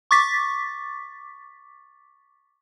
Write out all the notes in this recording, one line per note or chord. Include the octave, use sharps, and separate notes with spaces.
C#6 D6 A6 B6